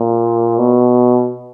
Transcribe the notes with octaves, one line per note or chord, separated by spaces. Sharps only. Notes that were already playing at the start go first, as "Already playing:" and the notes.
Already playing: A#2
B2